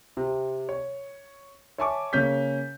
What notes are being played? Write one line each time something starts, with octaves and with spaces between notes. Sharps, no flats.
C3
C#5
C#5 E5 G#5 A5 C#6 D6
C#3 A#3 C#4 G6 B6